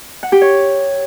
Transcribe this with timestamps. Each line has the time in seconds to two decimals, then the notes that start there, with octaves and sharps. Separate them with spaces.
0.23 F#5
0.32 G4
0.41 C#5